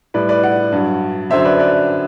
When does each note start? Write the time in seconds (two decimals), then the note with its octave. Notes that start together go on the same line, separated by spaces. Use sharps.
0.14 A2 G3 B4 D5
0.29 B4 D5
0.43 D5 F#5
0.72 G2 F#3
1.30 F#2 D3 F#3 C5 E5
1.45 B4 D5
1.59 B4 D5